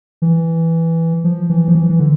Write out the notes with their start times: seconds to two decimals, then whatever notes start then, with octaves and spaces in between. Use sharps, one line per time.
0.22 E3
1.24 F3
1.50 E3
1.68 F3
1.75 E3
1.89 E3
1.99 D3